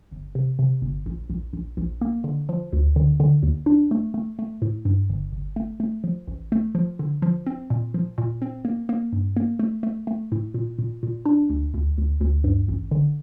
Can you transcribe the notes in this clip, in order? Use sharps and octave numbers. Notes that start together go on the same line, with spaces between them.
G1
C3
C3
G1
A#1
A#1
A#1
A#1
A#3
D3
F3
D2
D3
D3
D#2
D4
A3
A3
A3
A2
G2
G1
G1
A3
A3
F3
A1
A3
F3
D3
F3
C4
A#2
F3
A#2
C4
A#3
A#3
G2
A#3
A3
A3
A3
A2
A#2
A#2
A#2
D4
D2
D2
D2
D2
G2
A1
D3